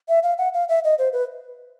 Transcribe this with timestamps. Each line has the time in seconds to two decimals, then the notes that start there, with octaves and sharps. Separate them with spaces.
0.09 E5
0.23 F5
0.38 F#5
0.54 F5
0.69 E5
0.84 D#5
0.98 C5
1.13 B4